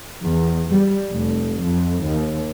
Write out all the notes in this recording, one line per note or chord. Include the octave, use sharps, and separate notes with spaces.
E2
G3
F1
F2
D#2